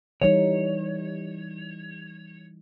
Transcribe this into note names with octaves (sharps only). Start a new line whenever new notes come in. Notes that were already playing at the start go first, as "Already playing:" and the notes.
E3 G3 D#4 C#5